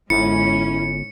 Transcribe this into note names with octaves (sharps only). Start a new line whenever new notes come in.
G1 G#2 C#4 E4 C#7